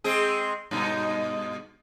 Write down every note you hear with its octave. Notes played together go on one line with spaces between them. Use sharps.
G#3 C4 G#4
G2 B2 D#4